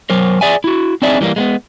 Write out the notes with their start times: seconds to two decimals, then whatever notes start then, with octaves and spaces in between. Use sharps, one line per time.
0.10 F#3 A#4 C5
0.41 G#4 D5 E5 G#5
0.64 E4 F#4
1.02 C4 D4 D#4 G#4 D5 E5
1.21 E3 G3 A3 A#3
1.36 G#3 A#3 B3